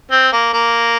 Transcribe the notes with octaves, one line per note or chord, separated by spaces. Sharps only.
C4
A#3
A#3